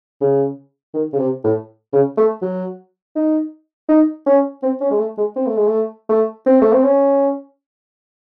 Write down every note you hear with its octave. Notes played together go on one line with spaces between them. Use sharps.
C#3
D#3
C#3
C3
A2
C#3
A3
F#3
D#4
D#4
C#4
C4
C#4
G#3
A3
G#3
C4
A3
G#3
A3
A3
C4
A3
C4
C#4